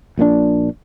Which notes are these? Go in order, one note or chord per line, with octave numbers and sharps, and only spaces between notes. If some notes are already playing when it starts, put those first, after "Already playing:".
A#1 A#2 F3 D4